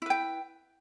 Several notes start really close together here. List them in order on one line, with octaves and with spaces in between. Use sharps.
E4 B4 G5